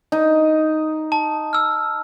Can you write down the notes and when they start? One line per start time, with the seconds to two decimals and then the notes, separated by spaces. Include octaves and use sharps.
0.12 D#4
1.12 A5
1.53 E6 F6